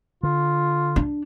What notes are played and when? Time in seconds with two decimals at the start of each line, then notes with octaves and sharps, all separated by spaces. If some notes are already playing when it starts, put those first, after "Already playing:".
0.23 D3 F4
0.96 D4